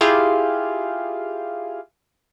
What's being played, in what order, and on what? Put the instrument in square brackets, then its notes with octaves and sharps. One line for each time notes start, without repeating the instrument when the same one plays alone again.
[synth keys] E4 F4 G4 G#4 F5